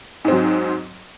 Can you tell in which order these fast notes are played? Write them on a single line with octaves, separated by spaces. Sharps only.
G#2 C4 F#3